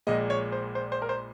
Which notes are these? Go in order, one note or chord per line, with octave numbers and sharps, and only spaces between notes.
A#1 A#2 G#3 D#5
C#5
C5
C5
C5
A#4
C5